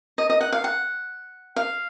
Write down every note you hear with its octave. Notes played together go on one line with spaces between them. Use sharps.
D#5
D#5
F#5
F5
F#5
F5